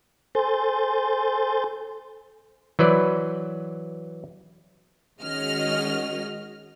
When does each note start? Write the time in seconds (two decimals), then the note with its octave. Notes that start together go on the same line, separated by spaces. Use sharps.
0.35 A4 C5 G#5 C6 G6 A6
2.79 E3 F#3 B4 C5 D5
5.20 D#3 G#3 C#4 F#4 D#5 F6